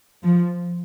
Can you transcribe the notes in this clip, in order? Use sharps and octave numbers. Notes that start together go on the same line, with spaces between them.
F3